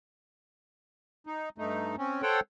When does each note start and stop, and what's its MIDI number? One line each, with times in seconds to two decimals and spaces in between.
1.27 1.49 63
1.58 1.96 43
1.58 1.96 57
1.58 1.96 63
1.98 2.22 60
1.98 2.22 61
2.22 2.40 69
2.22 2.40 72
2.22 2.40 73
2.22 2.40 78
2.22 2.40 79